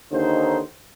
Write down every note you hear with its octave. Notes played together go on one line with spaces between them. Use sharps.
D#2 D3 D#4 C5